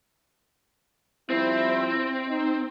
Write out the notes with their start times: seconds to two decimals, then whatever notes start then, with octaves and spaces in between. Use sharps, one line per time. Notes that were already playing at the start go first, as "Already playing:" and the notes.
1.30 F3 G3 C4 E4
2.28 D#4